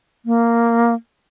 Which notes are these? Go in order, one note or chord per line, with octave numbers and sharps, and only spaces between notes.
A#3